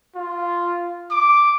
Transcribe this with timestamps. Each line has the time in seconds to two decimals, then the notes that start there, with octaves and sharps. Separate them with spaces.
0.15 F4
1.11 D6